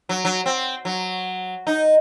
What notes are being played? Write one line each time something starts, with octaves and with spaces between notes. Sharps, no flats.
F#3
F#3
C4
F#3
D#4